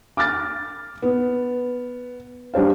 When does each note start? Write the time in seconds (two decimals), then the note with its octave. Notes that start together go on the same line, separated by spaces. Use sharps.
0.17 D6 F6 A6
1.02 B3
2.54 G3 D4 C5 F5